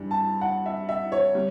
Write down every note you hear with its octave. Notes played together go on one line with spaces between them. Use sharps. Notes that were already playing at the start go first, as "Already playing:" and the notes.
Already playing: G2 E3 G3
A5
F#5
E5
E5
C#5
G3